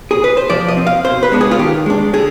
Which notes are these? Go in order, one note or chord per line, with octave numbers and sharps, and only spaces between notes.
G#4
B4
C5
F3 D5
D#5
C4
F5
B2 C5
B4
G#3 B3 D4
G#4
F4
D#3 G4
G#3 D4
D3 G#4